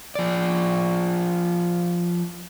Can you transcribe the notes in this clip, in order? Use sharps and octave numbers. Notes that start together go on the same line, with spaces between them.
F3 D5